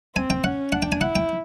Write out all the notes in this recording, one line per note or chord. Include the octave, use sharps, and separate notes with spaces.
C4 G#5
G5
C#4 F#5
D4 F#5
G5
G#5
E4 F#5
G5